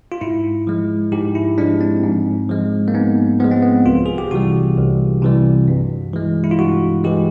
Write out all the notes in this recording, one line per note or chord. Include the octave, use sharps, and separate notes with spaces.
F4
G#2 E4
F3 G#3
G#2 G4
E4
F3 G#3 D4
C4
G#2
F3 G#3
A#3
G#2 B3
F3 G#3 B3
C4
B3
C2 F4
G#4
G4
C3 E3 G3 F#4
C2
C3 E3 G3
G2
E3 G#3
E4
F4
G2 F#4
E3 G#3 G4